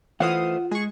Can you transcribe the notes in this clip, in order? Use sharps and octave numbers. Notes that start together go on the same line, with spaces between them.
E3 A3 F4 C5 F5 F#5 D#6
G#3 G#4 C#6